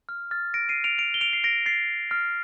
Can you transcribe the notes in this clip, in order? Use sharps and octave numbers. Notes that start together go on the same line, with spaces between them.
F6
F6 A6
A#6 D7
C7 D#7
D7 F7
D7 F7
G7
D7 F7
C7
A#6 D7
A6 C7
F6